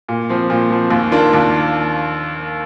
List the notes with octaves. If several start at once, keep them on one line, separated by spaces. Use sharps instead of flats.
A#2
F3 C4
A#2
F3 C4
D#2
D#3 A#3 D4 F4
D#2